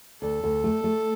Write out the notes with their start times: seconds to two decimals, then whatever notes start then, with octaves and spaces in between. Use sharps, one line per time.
0.22 D2 A4
0.44 D2
0.64 A3
0.84 A3